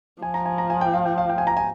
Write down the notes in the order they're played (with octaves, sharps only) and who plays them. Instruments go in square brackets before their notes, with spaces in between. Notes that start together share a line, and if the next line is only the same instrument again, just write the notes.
[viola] F3 [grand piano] G#5
[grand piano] A#5
G#5
A#5
G#5
G5
F5
G5
F5
G5
G#5
A#5
G#5